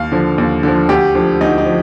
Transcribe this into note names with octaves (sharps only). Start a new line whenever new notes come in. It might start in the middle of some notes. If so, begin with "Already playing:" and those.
Already playing: D#2 F5
D3 F3
D#2
D3 F3
D2 G4
D3 F3
D2 D#4
D#4
F3